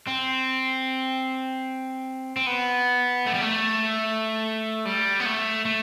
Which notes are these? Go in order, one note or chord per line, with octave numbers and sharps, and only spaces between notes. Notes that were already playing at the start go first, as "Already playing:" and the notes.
C4
C4
B3
A3
G3
A3
G3
B3
A3
A3